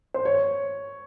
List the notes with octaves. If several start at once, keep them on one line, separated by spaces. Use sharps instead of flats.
C5
C#5